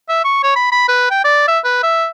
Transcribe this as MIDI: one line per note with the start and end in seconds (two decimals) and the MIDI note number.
0.09 0.20 76
0.24 0.42 85
0.43 0.53 73
0.56 0.67 83
0.72 0.85 83
0.88 1.08 71
1.10 1.21 79
1.24 1.44 74
1.48 1.59 76
1.64 1.80 71
1.83 2.07 76